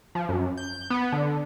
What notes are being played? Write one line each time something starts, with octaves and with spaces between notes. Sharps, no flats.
F3
F#2
G6
B3
D3